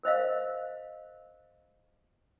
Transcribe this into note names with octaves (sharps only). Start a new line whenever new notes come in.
A#4 C5 D#5 F5